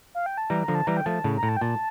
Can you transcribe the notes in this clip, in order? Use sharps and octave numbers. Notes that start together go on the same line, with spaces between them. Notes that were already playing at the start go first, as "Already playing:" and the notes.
F5
G5
A5
E3 G3 A#5
A#5
D3 F3
A5
E3 G3 A#5
G5
F3 A3 A5
A2 C#3
A#5
A2
A5
G5
A#2 A5